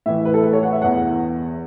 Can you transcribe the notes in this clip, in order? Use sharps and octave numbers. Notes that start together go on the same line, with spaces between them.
A2 E3 E5
B4
A4
B4
C#5
F#5
E5
E2 E3 F#5